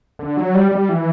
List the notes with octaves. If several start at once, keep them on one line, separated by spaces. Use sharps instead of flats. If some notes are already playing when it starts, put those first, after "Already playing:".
D3
F#3
G3
G3
E3